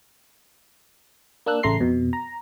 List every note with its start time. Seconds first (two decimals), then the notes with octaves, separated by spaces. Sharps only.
1.46 A#3 D4 E6 F#6
1.63 A1 C#3 A3 A#5 C6 C7
1.80 F2 B2
2.13 A#5